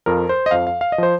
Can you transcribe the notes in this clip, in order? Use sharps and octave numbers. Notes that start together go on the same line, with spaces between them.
F2 F3 A#4
C5
D#5
F2 F3 F5
F5
F5
D#5
F3 C5